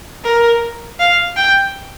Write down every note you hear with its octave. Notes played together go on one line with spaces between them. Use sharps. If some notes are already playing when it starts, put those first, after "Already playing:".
A#4
F5
G5